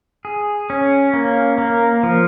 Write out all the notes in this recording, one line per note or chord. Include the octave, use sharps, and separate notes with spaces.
G#4
C#4
A#3
A#3
F3